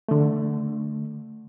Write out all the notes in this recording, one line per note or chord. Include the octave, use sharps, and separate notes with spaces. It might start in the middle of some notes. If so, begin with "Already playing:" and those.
D3 A3